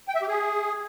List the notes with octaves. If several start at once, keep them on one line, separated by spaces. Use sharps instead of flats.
G5
E5
G4
G#4